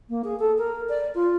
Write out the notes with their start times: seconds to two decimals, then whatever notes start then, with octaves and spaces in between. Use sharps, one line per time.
0.09 A#3
0.24 G#4
0.39 A4
0.58 A#4
0.89 D5
1.15 F4